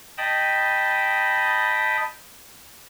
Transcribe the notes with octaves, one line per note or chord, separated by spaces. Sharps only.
D#5 G5 A5 B5 D#6